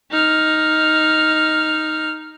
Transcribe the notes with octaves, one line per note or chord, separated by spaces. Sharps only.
D#4 F6